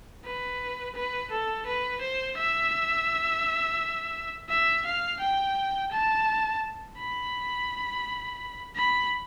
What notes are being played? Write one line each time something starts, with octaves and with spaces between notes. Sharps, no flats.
B4
B4
A4
B4
C5
E5
E5
F5
G5
A5
B5
B5